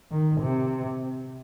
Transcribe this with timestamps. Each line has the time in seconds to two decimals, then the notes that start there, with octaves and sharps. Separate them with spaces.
0.12 D#3
0.42 C3